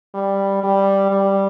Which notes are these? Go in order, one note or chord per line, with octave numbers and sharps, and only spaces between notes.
G3
G3
G3